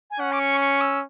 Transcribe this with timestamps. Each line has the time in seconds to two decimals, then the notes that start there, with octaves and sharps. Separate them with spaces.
0.11 G#5
0.19 C#4 F#5
0.32 D6
0.40 C#6
0.61 C#6
0.81 E6